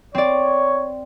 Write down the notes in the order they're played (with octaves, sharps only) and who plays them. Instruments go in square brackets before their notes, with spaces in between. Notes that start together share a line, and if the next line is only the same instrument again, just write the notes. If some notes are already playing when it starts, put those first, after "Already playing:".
[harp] C4 D5 [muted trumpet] C#5